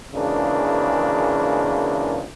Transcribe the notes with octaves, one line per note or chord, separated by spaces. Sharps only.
G#1 C#3 E3 A#3 D4